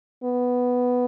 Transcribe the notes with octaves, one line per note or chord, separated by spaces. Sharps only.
B3